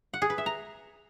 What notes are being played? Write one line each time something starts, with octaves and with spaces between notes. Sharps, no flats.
F#5
G#4
B4
E5
A#5